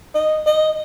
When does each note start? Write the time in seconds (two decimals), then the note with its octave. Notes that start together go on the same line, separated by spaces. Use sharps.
0.15 D#5
0.46 D#5